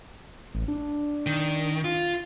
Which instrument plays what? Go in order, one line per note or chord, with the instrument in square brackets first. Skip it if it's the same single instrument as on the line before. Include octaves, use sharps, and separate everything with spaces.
[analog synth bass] A1
D4
[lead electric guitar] D#3
F4